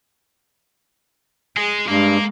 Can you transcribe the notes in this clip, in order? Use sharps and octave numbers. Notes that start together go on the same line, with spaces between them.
G#3 G#4
G2 G#3 A#3